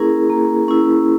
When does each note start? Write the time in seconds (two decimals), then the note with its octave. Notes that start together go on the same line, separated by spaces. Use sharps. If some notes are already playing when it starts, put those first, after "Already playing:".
Already playing: A#3 C#4 E4 G#4 A#4
0.30 A#3
0.68 C#4 E4